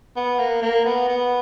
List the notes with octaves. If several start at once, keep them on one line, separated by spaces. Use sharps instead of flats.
B3
A#3
A#3
B3
B3